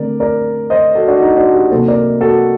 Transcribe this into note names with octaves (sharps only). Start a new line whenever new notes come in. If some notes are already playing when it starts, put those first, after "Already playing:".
Already playing: D3 A3 C4 A#4 D5
A#4 D5
C5 D#5
F#4 A4
D4 F#4
D#4
D4 F#4
D#4 G4
C3 F#3 A#3 A4 C5
A#4 D5
F#4 A4